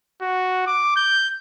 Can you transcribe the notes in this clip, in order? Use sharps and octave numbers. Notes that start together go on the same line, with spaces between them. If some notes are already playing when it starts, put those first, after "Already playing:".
F#4
D6
G6